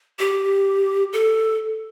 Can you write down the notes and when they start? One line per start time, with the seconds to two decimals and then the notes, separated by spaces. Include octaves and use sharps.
0.19 G4
1.13 A4